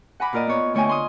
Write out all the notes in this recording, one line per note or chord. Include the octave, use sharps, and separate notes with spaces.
F#5 G#5 A#5 B5 D6
A#2 F4 A#4 D5 D#5
B3 C#5
D3 A3 C#5 D#5 G5 G#5
G#5 C6 D#6